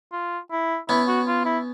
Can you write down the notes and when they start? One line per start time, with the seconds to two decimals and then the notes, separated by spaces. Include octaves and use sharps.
0.12 F4
0.51 E4
0.89 B3 C#4 E4
1.08 F#4
1.27 F4
1.45 E4